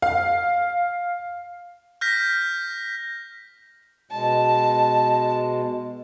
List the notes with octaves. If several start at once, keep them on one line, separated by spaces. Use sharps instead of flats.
F5
F6 G6 A#6 B6
B2 G#3 A5